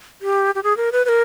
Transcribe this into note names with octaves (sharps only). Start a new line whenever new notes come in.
G4
G4
G#4
A#4
B4
B4
A#4